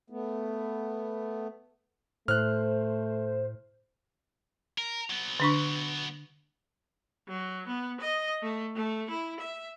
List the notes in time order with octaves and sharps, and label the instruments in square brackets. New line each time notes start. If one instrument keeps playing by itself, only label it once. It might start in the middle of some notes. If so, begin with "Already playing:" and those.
[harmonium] A3 B3
[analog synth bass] A2 [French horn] A3 [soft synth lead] C5 [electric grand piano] F6 F#6
[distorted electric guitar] A#4
F#3 B3
[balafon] D3 D4 C#6
[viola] F#3
B3
D#5
A3
A3
E4
E5